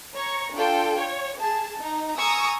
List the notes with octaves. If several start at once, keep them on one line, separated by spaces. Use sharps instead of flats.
C#5 A#5 C#6
D4 F4 A4 G5
C#5
G#4 A5
D#4 A#5
G#5 A#5 C#6 D#6 E6